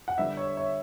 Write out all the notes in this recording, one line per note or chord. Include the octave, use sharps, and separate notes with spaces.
F#5
D3 G3 B3 E5
C#5
C#5